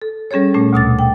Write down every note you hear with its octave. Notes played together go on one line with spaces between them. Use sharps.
A4
G3 C#4 G#4 A4 C#5
A#2 A3 C#4
D2 B2 D6 A6
G5